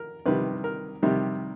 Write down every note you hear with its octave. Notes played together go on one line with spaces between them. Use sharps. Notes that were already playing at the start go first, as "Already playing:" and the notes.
Already playing: A#4
C3 D#3 G3 B4
A#4
C3 D#3 G3